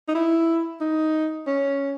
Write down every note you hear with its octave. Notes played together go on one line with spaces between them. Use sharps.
D#4
E4
D#4
C#4